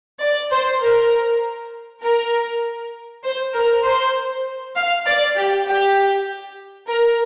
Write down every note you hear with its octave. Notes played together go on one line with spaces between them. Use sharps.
D5
C5
A#4
A#4
C5
A#4
C5
F5
D5
G4
G4
A#4